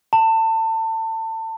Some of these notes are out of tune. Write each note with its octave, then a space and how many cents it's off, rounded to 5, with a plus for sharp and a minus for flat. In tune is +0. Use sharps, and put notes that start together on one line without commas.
A5 +30